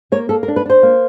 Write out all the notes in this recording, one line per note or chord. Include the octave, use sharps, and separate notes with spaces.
A#3 C#5
A#3 A4
A#4
D4
B4
D4 C5
A#3